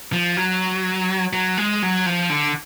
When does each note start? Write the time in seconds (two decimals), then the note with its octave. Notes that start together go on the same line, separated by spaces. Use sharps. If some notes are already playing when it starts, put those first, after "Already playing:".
0.13 F3
0.37 F#3
1.33 F#3
1.57 G#3
1.82 F#3
2.06 F3
2.30 D3